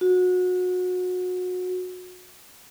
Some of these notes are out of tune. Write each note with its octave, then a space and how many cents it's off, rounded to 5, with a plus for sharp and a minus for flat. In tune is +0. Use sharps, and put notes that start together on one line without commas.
F#4 -25